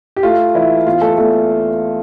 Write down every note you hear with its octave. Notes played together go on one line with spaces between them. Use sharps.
G4
A3 F4
E3 E4
E2 F4
A3 A4
E2 A3 A4